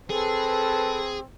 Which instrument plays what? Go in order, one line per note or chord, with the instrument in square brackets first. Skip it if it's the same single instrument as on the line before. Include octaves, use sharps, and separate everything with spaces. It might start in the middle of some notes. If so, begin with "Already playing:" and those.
[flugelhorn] C4 [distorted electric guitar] G#4 [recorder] A4 [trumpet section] B4 A5